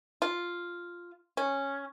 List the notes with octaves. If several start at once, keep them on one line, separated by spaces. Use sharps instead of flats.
F4
C#4